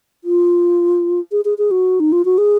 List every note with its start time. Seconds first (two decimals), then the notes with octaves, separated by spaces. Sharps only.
0.24 F4
1.32 G#4
1.45 G#4
1.58 G#4
1.71 F#4
2.00 D#4
2.12 F4
2.25 F#4
2.38 G#4